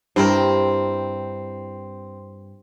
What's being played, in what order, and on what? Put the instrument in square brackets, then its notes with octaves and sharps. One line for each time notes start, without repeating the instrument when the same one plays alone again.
[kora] G2 E4 A#4 [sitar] C4